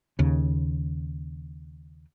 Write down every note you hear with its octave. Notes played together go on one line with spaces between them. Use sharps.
D#2 C#3